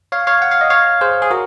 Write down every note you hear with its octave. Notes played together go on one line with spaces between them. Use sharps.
C#5 F5
C#5 F5
F#5
F5
D#5
C#5 F5
G#4 C5
G#4
F#4 A#4